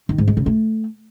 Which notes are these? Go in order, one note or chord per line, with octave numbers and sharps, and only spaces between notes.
D#3
G#2
G#3
C#3
A3